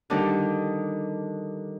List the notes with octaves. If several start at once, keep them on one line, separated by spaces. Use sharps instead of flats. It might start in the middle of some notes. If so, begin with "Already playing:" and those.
D3 D#3 G3 D4 D#4